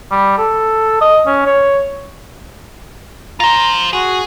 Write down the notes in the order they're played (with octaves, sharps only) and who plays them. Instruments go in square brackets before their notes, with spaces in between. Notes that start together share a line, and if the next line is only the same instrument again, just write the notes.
[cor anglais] G3
A4
D#5
C#4
C#5
[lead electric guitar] F4 C5 [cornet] A#5
[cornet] F#4 [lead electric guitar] G#4